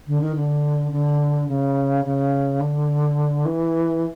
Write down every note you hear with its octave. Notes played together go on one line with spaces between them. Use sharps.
D3
D#3
D3
D3
C#3
C#3
D3
E3